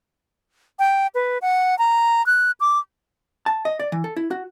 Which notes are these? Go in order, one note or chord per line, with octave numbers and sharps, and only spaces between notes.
G5
B4
F#5
A#5
F#6
D6
A5
D#5
D5
E3
A4
E4
F#4